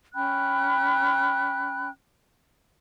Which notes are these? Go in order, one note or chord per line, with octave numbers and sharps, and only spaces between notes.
C#4 G5 B5 F#6